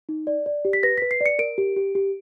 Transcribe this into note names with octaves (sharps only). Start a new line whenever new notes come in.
D#4
D5
D5
G4
B6
B4 A#6
B4 B6
C7
D5 C#7
A#4 D7
G4
G4
G4